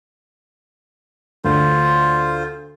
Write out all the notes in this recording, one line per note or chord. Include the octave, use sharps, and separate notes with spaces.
D2 F4 C5